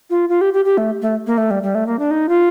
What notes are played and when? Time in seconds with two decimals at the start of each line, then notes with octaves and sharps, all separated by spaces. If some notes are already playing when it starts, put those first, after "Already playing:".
0.10 F4
0.29 F4
0.41 G4
0.53 G4
0.65 G4
0.78 A3
1.02 A3
1.27 A#3
1.38 A3
1.51 G3
1.63 G3
1.75 A3
1.86 A#3
1.99 D4
2.11 D#4
2.29 F4